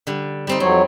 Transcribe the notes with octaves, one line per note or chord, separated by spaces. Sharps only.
D3 G3
G3 C4 D#4
F2 F#3 C4 C#5